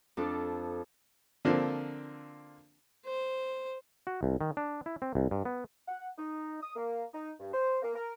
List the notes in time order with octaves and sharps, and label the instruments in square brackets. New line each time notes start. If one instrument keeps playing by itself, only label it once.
[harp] F2 D4 A4
[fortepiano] D3 F3 A#3 C4 D4
[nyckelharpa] C5
[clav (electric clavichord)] F#4
C2
D#3
D4
E4
C4
C2
G2
B3
[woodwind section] F#5
D#4
D#6
A#3
D#4
G2
C5
A#3
A#4